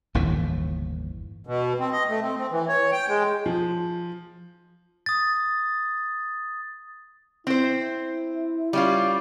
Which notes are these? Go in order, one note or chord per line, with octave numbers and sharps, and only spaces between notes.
G1 D#2 A2 E3
B2
C4
D#5
A3
C4
C4
E3
C#5
G5
G#3
F3
D#6 A6
C4 E4 C5
G3 C#4 F4